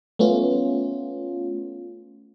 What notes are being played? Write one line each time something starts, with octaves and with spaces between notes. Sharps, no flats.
A3 B3 C#4 F4